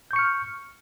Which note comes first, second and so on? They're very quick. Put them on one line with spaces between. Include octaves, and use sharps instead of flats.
G6 C#6 C#7 F6